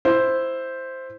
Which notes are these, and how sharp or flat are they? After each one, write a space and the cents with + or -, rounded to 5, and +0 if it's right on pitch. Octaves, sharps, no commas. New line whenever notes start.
E4 +0 C5 +0